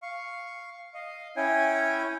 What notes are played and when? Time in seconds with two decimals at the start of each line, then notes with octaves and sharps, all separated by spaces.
0.02 F5 C#6
0.94 D#5 F5
1.36 C#4 E4 C#5 G5 G#5